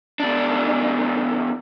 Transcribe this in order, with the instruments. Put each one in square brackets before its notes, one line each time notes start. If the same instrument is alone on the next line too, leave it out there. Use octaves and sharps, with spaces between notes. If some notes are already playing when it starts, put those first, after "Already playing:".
[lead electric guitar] E2 D4